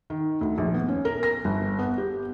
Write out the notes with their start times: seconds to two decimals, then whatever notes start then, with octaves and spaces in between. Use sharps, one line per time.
0.10 D#3
0.41 D2
0.58 A#1
0.74 B3
0.88 C#4
1.05 A#4
1.23 A#6
1.45 G1
1.79 B3
1.98 G4